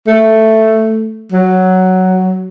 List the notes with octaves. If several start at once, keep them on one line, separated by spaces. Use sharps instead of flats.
A3
F#3